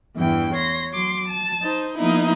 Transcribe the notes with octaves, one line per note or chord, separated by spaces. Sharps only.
E2 G2 E3 G5
C#5 C6 A#6
F#3 C6 D6
A5
D#4 C5
F3 A#3 B3 D#4 E4 A#5